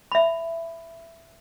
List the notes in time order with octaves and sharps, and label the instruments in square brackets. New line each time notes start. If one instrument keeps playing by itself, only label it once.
[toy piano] E5 B5